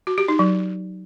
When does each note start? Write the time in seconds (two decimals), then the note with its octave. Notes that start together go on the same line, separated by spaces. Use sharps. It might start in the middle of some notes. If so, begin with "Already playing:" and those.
0.07 F#4
0.18 G4
0.28 D#4
0.39 F#3